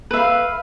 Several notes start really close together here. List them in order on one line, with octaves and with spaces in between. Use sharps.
B4 E5 F5